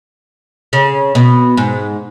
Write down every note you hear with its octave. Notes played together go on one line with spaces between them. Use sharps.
C#3
B2
G#2